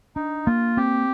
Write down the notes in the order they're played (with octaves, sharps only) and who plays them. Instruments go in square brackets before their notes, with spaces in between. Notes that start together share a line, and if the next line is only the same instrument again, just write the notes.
[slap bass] D4 [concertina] D#4
[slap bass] A#3 [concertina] F4
[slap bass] C4 [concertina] G4